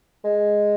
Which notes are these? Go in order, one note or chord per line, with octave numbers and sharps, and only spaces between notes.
G#3